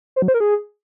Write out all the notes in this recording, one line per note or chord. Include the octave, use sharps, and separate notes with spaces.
C5
F#3
C5
A#4
G#4